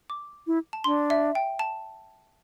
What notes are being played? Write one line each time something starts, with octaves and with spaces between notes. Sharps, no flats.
D6
E4
A5
D4 C6
E5
G5
A5